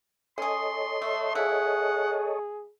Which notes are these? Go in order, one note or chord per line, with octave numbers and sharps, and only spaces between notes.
C#4 G#4 A4 C#5 D#5 C6
A3
F3 E4 G#4 F#5